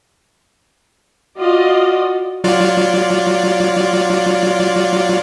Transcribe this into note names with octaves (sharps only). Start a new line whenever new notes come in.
F4 F#4 D5 D#5
F#3 F4 D5